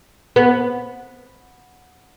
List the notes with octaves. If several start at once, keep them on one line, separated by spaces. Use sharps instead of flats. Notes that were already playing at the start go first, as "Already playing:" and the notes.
B3